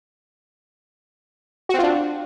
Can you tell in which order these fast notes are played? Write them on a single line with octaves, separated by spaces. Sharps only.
F#4 C4 F4 D4